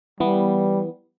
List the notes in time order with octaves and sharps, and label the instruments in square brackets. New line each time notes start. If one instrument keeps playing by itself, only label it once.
[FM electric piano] E3 B3 [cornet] G3